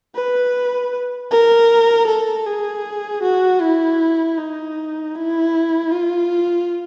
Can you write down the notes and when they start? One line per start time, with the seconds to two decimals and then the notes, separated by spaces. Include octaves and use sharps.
0.15 B4
1.31 A#4
2.07 A4
2.46 G#4
3.23 F#4
3.62 E4
4.38 D#4
5.15 E4
5.92 F4